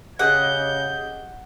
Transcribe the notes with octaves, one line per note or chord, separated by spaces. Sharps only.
C#3 G4 G#4 D#5 F#5 G6